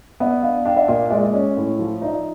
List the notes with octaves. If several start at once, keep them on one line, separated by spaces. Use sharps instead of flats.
B3 D5 E5
D4 D#5 F5
D4 F5 G5
E5 F#5
A#2 D#5 F5
G#3 D5 E5
D5
C#4 C#5 D#5
A2
F3
D#4 D5 E5